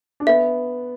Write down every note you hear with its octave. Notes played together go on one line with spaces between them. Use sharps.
D4
B3 E5